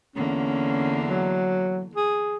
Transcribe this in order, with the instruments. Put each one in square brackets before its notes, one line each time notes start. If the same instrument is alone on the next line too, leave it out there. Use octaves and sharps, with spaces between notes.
[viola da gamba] E2 D3 A#3 [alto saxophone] C#4
[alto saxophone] F#3
G#4